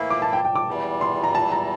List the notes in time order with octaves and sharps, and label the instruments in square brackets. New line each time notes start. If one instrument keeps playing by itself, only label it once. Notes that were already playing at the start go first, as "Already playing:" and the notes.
Already playing: [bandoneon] A2 E3 A#3 E4
[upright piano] D6
A5
G5
G5
D6
[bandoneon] E2 E3 G3
[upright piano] C6
A#5
A5
A#5